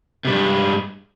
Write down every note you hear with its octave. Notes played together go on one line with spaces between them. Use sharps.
G2 C3 G3 G#3